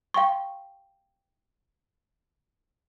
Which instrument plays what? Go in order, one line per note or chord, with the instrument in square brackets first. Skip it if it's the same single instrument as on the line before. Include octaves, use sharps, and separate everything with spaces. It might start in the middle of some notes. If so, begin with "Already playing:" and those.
[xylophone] F5 G5 C6 C#6